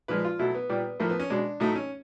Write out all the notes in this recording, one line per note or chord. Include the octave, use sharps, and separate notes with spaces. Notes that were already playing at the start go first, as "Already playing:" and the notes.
A#2 F3 G#3 B4
F4
B2 F#3 A3 E4
B3
A#2 G3
A2 F3 A3 A#3
B3
C#4
B2 G#3 D4
A2 F#3 A3 D#4
C#4